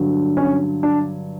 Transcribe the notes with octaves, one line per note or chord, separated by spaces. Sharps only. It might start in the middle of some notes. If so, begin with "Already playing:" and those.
Already playing: G2 D3 F#3
C#4
D4